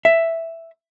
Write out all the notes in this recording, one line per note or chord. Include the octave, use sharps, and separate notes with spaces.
E5